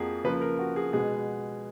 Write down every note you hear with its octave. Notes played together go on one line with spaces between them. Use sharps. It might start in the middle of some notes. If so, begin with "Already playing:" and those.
Already playing: F2 F3 A#3 F#4 G#4
C#3 F3 A#3 B4
A#4
F#4
G#4
B2 G#3 B3 G#4